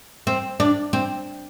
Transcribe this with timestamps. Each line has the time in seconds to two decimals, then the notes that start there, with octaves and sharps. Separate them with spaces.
0.27 C4
0.60 D4
0.93 C4